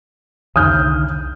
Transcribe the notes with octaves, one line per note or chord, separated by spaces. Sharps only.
C2 D3 D#3 D#6 F6 G6